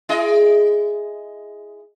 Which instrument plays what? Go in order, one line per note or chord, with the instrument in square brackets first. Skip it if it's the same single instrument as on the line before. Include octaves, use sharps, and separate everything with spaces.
[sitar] E4 G#4 D#5